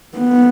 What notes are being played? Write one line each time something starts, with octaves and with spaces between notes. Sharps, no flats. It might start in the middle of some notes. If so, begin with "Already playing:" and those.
B3